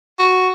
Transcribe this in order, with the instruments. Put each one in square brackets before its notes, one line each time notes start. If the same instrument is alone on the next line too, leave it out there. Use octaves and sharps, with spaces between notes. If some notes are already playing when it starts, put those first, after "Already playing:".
[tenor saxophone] F#4